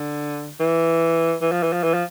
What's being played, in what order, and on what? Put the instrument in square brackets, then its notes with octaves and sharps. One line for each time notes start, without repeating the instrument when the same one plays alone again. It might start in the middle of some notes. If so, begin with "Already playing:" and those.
Already playing: [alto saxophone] D3
E3
E3
F3
E3
F3
E3
F3